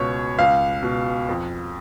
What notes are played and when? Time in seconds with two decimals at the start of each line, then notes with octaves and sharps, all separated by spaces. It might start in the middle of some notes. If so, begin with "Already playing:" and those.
Already playing: C#2 B2 C#5
0.39 C#2 F5
0.83 B2
1.29 F2